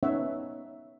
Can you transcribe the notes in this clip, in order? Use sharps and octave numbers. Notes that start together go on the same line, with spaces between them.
B3 C#4 D#4 C#5 E5 F#5